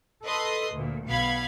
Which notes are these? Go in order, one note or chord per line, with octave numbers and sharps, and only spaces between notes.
A4 B4 D#5 C6 D#6
D2 A#2
B1 B2 F5 B5 G#6